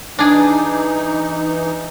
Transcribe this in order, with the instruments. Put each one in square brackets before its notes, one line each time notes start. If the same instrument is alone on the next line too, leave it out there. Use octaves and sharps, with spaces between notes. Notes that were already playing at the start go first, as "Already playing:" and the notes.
[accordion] E3 D#4 [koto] D4 G#4